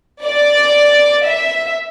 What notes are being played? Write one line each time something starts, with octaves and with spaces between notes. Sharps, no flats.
D5
E5